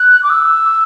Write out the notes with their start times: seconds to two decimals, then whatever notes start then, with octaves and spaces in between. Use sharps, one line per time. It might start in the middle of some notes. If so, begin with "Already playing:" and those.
Already playing: F#6
0.23 D6
0.30 E6